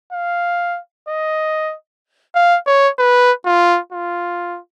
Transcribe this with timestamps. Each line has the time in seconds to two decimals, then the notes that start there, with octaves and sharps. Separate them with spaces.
0.13 F5
1.08 D#5
2.35 F5
2.67 C#5
2.99 B4
3.46 F4
3.92 F4